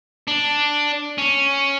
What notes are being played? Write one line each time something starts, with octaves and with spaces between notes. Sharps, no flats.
D4
C#4